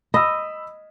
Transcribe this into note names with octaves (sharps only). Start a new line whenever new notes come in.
D#5 B5 E6